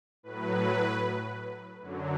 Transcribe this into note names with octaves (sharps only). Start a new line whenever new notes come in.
A2 F#3 B4
F#2 D3 F#3